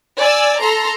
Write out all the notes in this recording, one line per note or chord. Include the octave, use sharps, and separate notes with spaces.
D5 G#5 E6
A4 A#5 C6